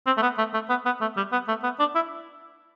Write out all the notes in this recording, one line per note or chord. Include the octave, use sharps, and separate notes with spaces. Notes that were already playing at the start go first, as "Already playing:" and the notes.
C4
A3
B3
A3
A3
B3
B3
A3
G3
B3
A3
B3
D4
E4